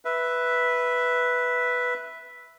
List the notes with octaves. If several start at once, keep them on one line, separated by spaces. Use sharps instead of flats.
B4 E5